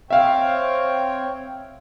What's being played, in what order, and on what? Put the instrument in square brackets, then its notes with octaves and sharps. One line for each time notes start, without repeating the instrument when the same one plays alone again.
[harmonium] C4 C#5 G5 [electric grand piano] E5 F5